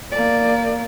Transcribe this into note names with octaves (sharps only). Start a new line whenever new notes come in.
A#3 D5